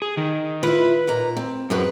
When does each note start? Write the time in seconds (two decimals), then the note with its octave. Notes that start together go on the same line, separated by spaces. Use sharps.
0.02 G#4
0.17 D#3
0.63 E4 F4 B4 B5
1.07 D#2 A#2 A#5
1.37 C4
1.70 F#2 C4 G#4 B4